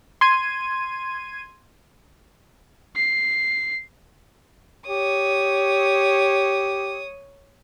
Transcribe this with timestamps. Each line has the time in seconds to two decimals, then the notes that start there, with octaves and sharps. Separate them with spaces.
0.21 C6 G#6 D#7
2.96 C7
4.89 G4 C#5 D#6